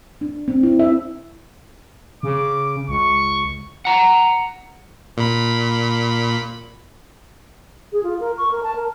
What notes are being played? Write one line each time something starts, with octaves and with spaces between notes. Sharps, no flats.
D4
C4
E4
E5
C#3 D6
C#2 C#6
F#5 A#5
A#2 B5
G#4
F4
A#4
C#6
A#4
A5
A#4